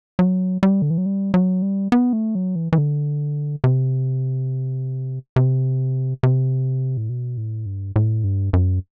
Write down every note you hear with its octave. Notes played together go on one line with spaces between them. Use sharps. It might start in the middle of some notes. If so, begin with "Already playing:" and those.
F#3
G3
D3
E3
F#3
G3
F#3
G3
B3
A3
F#3
E3
E3
D3
C3
C3
C3
A2
B2
A2
G2
A2
G2
F#2